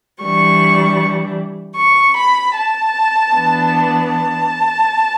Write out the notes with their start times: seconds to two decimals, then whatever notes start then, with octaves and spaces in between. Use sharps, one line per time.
0.21 E3 G3 D4 C#6
1.77 C#6
2.16 B5
2.55 A5
3.32 E3 B3 D4
4.09 A5